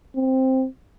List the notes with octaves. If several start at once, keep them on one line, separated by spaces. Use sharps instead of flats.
C4